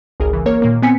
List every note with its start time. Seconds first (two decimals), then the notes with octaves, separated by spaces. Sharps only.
0.20 G#1 C#2 G#4 A#4
0.33 C#3 E3
0.46 A#3 A#4 C#5
0.62 A#2 D#3 A#3
0.82 B3 C4 G#5 B6 C#7